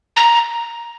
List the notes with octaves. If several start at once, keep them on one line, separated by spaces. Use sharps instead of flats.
A#5